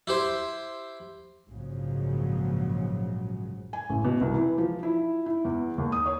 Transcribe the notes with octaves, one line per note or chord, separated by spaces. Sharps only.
E4 G4 C5
A#1 G#2 C#3 F3 F#3
G#5
A1
B2
C2
E3
F3
E4
E4
E2
D#2
D#6
C#5